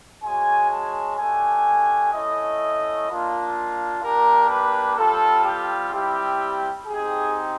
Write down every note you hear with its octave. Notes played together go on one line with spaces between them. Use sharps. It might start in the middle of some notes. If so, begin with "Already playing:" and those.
G#3 C#4 F#4 G#5
A5
A3 D4 G4 G#5
A3 C#4 E4 D#5
A#3 D4 F4
A#3 D4 G4 A#4
B4
G3 C4 F4 A4
G4
G3 C4 E4 G4
C4 D#4 G4 G#4